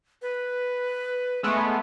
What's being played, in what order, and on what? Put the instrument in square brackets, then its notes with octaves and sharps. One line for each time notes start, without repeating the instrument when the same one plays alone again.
[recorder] B4
[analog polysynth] G#3 A3 B3